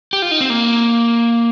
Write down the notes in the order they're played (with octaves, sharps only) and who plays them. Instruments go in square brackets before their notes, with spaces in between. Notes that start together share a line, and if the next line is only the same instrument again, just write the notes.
[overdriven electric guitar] G4
F4
D#4
C4
A#3